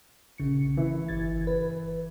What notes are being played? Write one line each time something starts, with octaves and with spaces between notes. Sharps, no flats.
A#1 C#3 C#7
E3
G1 G#6 A6
B4